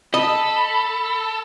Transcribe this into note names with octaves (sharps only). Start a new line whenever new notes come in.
A4 D#5 B5